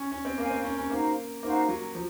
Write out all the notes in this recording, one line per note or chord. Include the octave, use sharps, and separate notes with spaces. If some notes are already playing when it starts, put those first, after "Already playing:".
Already playing: C#4
C#4
C4
A#3 C5 F5 G#5
C4
C#4
C#4
A#3 D#4 F#4 C5 F5
A#3 D#4 F#4 C5 F5
F#3
F3